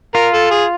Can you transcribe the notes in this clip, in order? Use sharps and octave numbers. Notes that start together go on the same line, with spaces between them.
F4 A#4
A4
G#4